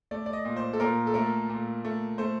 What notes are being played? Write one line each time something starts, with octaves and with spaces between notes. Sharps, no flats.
A3 D5
D5
D#5
A#2
C5
A4
A#2 A#4
A4
A3 A#4
A#2
A3
A3 C5